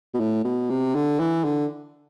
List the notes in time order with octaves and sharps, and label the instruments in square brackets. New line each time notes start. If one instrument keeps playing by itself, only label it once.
[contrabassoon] B2
A2
B2
C3
D3
E3
D3